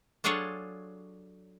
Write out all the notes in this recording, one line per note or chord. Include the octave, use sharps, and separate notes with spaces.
F#3 D4 F4 G#4 A4 C#5